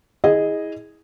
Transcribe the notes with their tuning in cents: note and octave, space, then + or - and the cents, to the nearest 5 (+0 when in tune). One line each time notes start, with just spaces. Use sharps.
E4 -25 G#4 -10 D#5 +0